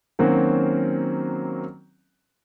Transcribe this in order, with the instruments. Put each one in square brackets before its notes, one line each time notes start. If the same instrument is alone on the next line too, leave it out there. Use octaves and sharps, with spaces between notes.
[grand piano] D#3 F#3 A#3 C4 C#4 F#4